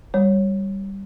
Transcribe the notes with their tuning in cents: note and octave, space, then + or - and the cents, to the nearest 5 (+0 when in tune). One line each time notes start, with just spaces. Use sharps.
G3 +0 C#5 -15